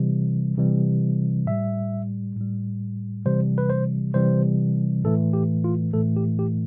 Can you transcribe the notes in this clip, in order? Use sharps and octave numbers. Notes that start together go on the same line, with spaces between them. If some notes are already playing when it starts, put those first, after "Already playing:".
Already playing: C3 E3 G3
C3 E3 G3
A2 G3 E5
A2
G3
C3 E3 G3 C5
B4
C5
C3 E3 G3 C5
A2 E3 A3 A4
G4
F4
A2 E3 A3 A4
G4
G4